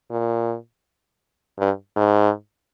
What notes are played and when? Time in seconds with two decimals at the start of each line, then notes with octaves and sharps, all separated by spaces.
0.10 A#2
1.59 G2
1.96 G#2